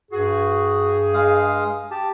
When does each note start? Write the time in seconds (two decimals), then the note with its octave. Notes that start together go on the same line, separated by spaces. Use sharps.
0.12 G2 F#4 G#4
1.14 G#3 F5 D#6
1.91 G4 A5